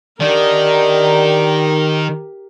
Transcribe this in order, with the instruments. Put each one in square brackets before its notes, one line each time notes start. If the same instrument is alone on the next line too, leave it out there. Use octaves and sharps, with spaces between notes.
[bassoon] D3 [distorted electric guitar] D#3 [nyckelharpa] G4 A#4